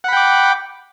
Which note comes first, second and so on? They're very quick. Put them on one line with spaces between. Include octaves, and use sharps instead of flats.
F#5 B5 G5 D6